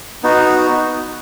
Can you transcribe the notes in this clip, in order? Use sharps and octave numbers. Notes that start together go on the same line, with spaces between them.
B3 D#4 F#4